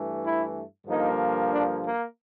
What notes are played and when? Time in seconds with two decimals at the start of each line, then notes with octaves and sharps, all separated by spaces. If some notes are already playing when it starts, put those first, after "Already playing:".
Already playing: G2 E3 A3
0.22 E4
0.86 G2 D3 F3 A#3 D#4
1.51 D4
1.82 A#3